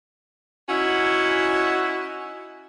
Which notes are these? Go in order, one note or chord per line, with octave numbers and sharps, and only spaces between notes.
C#4 D#4 E4 F#4